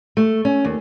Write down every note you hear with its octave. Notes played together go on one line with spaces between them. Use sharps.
A3
C#4
D#2